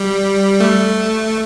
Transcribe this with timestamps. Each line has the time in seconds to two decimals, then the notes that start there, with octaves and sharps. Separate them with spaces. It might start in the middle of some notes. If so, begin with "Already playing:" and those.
Already playing: G3
0.60 A3